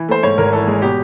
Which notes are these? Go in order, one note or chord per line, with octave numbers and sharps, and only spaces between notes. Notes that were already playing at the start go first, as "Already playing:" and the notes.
Already playing: E3
A3 C5
G#2 C#5
G#1 A#4
E3 A4
G#3
B2 G4